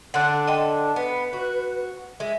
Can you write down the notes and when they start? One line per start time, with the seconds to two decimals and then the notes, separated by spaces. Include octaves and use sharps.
0.14 D3 D4 F#5 C6 F#6
0.48 D#5 G5 A5 C6
0.96 B3 B4
1.33 F#4
2.20 G#3 E5